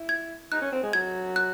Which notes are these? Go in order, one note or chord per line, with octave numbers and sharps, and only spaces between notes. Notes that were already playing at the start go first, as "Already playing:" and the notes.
Already playing: E4
G#6
D#4 F#6
C#4
C4
G#3
F#3 G#6
F#6